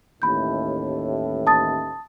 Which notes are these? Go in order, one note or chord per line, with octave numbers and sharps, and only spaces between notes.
A1 D#2 A2 B5 G6
A5 D#6 A6